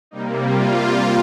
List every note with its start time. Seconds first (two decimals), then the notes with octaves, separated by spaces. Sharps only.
0.11 C3 G3 A#3 D#4
0.45 F4